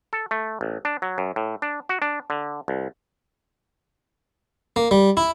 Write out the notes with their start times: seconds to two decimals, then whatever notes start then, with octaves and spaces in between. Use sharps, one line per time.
0.13 A4
0.31 A3
0.61 A1
0.85 D4
1.02 F#3
1.18 F#2
1.36 A2
1.62 D4
1.89 F#4
2.02 D4
2.30 D3
2.68 C2
4.76 A#3
4.91 G3
5.17 E4